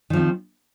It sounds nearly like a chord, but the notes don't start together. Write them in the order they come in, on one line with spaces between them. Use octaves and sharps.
D#3 F3 C4